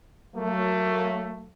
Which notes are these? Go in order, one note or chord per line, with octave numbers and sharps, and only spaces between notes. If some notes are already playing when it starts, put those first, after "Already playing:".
F#3 A3 A#3